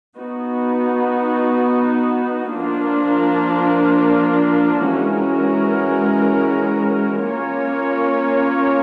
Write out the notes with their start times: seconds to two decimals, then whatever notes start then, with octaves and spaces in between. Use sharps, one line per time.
0.17 B3 D#4 F#4
2.55 F3 A#3 D4 F4 A#4
4.92 E3 G#3 C#4 F#4 A#4
7.30 A#3 C#4 F4 A#4 C#5